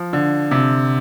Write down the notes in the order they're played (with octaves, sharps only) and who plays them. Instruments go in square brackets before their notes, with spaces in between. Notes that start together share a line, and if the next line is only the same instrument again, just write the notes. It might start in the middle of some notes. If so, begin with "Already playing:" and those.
Already playing: [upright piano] F3
D3
C3